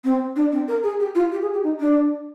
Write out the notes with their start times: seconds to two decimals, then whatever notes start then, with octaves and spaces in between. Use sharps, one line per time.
0.04 C4
0.36 D4
0.52 C4
0.68 A#4
0.83 G#4
1.00 G4
1.15 F4
1.32 G4
1.42 G#4
1.53 G4
1.63 D#4
1.80 D4